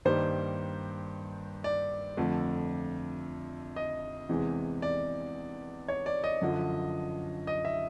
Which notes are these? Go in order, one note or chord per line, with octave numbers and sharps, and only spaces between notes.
G2 D#3 G3 A#3 C5
D5
F2 D3 F3 A3
D#5
E2 C3 E3 G#3
D5
C#5
D5
D#5
F#2 D3 F3
D#5
E5